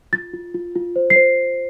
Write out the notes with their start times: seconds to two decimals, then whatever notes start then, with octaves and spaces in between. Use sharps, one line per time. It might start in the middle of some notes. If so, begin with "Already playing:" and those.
0.13 F4 A6
0.34 F4
0.54 F4
0.75 F4
0.96 C5
1.10 C7
1.16 C5